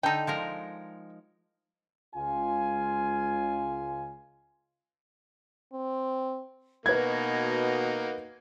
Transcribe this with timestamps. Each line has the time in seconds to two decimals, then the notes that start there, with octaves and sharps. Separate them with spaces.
0.03 D3 D#4 A4 G5
0.27 F3 G#3 A#4
2.15 C#2 F4 G#5
5.73 C4
6.86 B2 A#3 D#4 F#4 B4 G#6